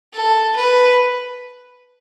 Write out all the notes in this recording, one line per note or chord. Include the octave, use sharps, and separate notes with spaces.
A4
B4